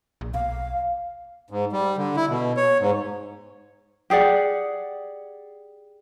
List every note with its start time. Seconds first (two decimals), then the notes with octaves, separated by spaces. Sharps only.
0.21 A#1
0.34 B1 F5
1.50 G#2
1.73 G3
1.97 D3
2.16 E4
2.29 B2
2.57 C#5
2.81 G#2
4.10 G4 G#4 D5 F#5